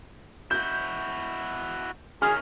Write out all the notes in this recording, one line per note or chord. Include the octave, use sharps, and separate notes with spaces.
E4 F#4 G6
D#3 C#4 G#4 F6